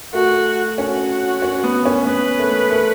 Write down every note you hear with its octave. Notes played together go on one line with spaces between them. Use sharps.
A3 F#4
C#4 F#4
C#4
B3
C#4
B3 B4
A3
A3